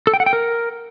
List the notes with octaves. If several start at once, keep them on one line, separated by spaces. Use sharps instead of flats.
A4
G5
F#5
G5
A#4